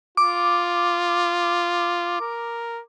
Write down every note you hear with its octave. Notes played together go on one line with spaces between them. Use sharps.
F4 D6
A#4